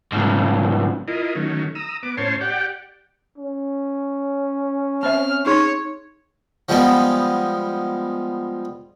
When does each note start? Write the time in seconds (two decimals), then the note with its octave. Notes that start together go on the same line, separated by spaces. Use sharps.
0.12 C2 G#2
1.08 E4 F4 A#4 D#5
1.35 D#3 F#3 A3 C#4
1.75 A#5 D#6 E6
2.03 B3 D6
2.17 A2 C#4 C5 C#5 A5 C6
2.41 G4 D5 F#5 G5
3.38 C#4
5.03 C4 C5 E5 F6
5.46 D#4 G#4 C#5 C6
6.69 F3 G3 G#3 B3